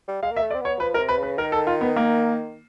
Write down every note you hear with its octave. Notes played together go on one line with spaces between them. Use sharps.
G3
G#3 F5
A#3
E5
A3
D5
C4
B3 C#5
F3 B4
A#4
C3
B4
C#3 B4
D#3 A#4
A4
F4
B3
A#3